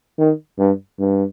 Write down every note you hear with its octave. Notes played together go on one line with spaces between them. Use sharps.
D#3
G2
G2